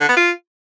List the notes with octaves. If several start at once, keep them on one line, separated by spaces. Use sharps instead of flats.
D3
B3
F4